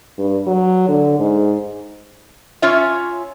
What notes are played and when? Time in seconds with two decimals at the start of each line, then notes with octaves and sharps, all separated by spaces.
0.18 G2
0.47 F#3
0.88 D3
1.19 G#2
2.62 C#4 F4 C#5 E5